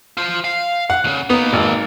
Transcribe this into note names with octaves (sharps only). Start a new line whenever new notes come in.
F4 C5
F5
F#5
C#2 C#3
A#3 B3 D#4
G#1